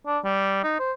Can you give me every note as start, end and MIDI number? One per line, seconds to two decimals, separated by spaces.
0.07 0.19 62
0.24 0.61 55
0.64 0.75 63
0.79 0.92 72